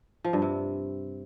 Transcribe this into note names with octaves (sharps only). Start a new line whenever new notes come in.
F3
G2
C3